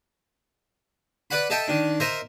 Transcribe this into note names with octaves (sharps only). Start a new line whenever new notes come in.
B4 D5 F#5 B5
A4 D#5 E5 G5 A5
D#3 D4
A#4 C5 D#5 E5